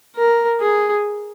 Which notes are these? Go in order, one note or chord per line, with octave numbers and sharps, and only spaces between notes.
A#4
G#4